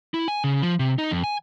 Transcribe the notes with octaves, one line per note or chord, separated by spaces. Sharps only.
E4
G#5
C#3
F3
C3
D#4
F2
G#5